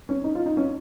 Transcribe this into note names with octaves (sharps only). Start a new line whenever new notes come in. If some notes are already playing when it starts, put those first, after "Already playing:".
C#4
D#4
F4
D#4
C#4